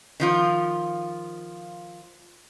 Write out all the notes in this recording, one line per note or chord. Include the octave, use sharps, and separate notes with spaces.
D#3 F3 F4